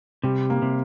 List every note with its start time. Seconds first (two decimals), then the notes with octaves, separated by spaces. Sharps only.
0.23 C3 G3
0.50 A#3
0.62 C3